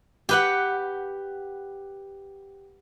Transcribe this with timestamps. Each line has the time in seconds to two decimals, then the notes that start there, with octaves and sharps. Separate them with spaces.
0.29 G4 B4 F#5